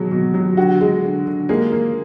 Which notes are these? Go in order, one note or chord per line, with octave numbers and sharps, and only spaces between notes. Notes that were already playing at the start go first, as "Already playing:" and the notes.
Already playing: B2 F#3 G#3
B2
F#3
D3 F#4
G#3
D3
D3
G#3 A#3 G#4
A#3